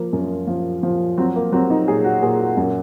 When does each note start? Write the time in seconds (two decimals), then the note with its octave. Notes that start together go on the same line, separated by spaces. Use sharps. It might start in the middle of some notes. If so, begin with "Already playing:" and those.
Already playing: F3 A#3
0.13 F#2
0.47 F3
0.83 F3
1.18 F#3 C4
1.36 A#3
1.52 F#3 C4
1.70 D#4
1.88 A#2 G#4
2.04 F#4
2.23 A#2 G#4
2.40 F#4
2.57 F#2